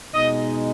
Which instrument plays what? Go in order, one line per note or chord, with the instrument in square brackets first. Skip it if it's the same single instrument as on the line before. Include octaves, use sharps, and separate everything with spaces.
[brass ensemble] B2 G#3 D#4 D#5